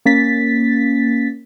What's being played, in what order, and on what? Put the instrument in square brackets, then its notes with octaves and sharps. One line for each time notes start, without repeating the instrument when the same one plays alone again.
[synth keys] A#3 C#4 A6 B6